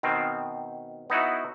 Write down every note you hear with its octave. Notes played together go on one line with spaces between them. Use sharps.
B2 D#3 C4
B3 D#4 E4 F#4